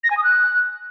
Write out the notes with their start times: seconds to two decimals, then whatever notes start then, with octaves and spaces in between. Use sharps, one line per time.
0.04 A#6
0.10 G#5
0.17 D#6
0.24 F#6